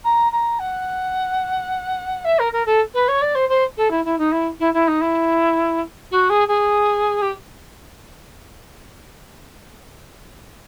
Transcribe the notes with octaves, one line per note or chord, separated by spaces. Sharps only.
A#5
A#5
F#5
E5
A#4
A#4
A4
B4
C#5
D5
C5
C5
A4
E4
E4
D#4
E4
E4
E4
D#4
E4
F#4
G#4
G#4
G4